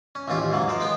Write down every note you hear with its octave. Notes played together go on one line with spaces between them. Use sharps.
C#4
A1 D#2 C#4 F4 G4
G#2 C#3 E3 F#3
F3 A#4 C5
G#3 B3 G5